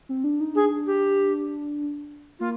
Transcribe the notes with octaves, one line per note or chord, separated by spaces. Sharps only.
C4
D4
D#4
D4 G#4
G4
A#3 F4